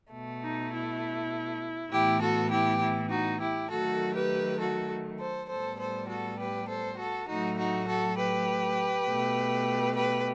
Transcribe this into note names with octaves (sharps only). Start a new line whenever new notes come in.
B2 A3
D#4
E4
A2 E3 B3 E4 G4
F#4 A4
E4 G4
E4
D#4 F#4
E4 G4
D#3 F#3 A3 F#4 A4
G4 B4
F#4 A4
A4 C5
A2 G3 B3 A4 C5
A4 C5
F#4 A4
G4 B4
A4 C5
F#4 A4
A2 F#3 A3 D#4 F#4
D#4 F#4
F#4 A4
G4 B4
B2 A3
G4 B4